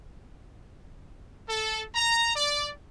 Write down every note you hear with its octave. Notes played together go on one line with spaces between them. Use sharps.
A4
A#5
D5